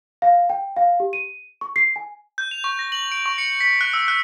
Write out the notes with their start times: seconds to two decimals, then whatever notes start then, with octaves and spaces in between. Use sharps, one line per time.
0.22 F5
0.50 G5
0.76 F5
1.00 G4
1.13 D#7
1.61 C#6
1.76 C7
1.96 G#5
2.38 G6
2.51 F7
2.64 C#6
2.79 A#6
2.92 F#7
3.12 D7
3.26 C#6
3.38 C#7
3.61 B6
3.81 F#6
3.93 E6
4.08 F#6